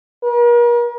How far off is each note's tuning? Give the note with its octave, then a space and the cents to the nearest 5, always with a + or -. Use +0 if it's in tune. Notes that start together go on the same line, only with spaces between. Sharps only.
A#4 +40